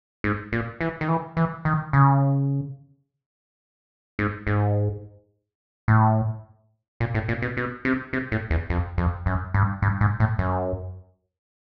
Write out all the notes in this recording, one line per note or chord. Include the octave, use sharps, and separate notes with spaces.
G#2
A#2
E3
D#3
E3
E3
D#3
C#3
G#2
G#2
A2
A#2
A2
A#2
B2
B2
C3
C3
A2
E2
F2
F2
F#2
G2
G2
G#2
A2
F#2